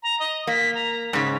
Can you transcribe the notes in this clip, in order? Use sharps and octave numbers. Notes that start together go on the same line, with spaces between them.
A#5
D#5
A#3 B6
A#5
G#2 C#3 B6